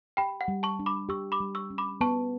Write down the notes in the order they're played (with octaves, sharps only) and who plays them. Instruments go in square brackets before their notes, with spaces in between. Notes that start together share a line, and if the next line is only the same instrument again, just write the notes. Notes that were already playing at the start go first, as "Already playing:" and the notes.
[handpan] G4 [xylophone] G5 B5
[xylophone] F#5
[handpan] G3
[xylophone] A5 C#6
[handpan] D4
[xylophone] B5 D6
[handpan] G4 [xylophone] C#6 E6
[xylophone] B5 D6
[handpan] G3
[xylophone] C#6 E6
[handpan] C#4
[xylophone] B5 D6
[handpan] B3 [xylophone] A5 C#6